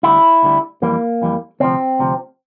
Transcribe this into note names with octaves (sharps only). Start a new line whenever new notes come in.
D2 D3 G3 E4
D2 D3 G3
F2 E3 G3 A#3
F2 E3 G3
D2 C3 F3 C4
D2 C3 F3